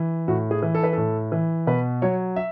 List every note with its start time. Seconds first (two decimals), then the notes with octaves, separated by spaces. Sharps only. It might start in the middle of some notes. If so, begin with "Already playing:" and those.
Already playing: E3
0.28 A2 F#4
0.51 G#4
0.62 E3
0.75 A4
0.84 B4
0.93 A2 A4
1.32 E3
1.67 B2 B4
2.02 F#3 C#5
2.36 E5